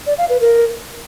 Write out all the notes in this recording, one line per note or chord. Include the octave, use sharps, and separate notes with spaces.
D5
F5
B4
A#4